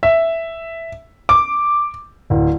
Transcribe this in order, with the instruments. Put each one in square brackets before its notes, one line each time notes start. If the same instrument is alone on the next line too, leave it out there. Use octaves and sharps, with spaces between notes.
[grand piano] E5
D6
D1